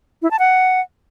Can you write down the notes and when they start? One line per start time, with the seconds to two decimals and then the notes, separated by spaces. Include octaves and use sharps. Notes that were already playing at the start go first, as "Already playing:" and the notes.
0.22 E4
0.31 A5
0.39 F#5